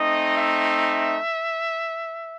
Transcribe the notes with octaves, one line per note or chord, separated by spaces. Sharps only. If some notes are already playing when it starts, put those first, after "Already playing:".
Already playing: A3 C4 D#4 D#5
E5